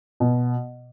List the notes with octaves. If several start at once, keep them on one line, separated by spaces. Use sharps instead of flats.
B2